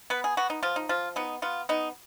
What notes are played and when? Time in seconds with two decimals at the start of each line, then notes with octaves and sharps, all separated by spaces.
0.10 B3 B4
0.24 G#4
0.37 B3 F#4
0.50 D#4
0.63 F3 F4
0.76 D#4
0.89 F3 F4
1.16 B3 D#4
1.42 B3 F4
1.69 B3 D#4